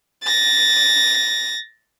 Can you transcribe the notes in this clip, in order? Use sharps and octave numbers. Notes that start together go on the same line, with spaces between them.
A6 A#6